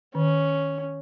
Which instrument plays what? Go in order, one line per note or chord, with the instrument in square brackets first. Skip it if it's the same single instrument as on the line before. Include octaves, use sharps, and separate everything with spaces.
[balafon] D#3 [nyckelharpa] C#4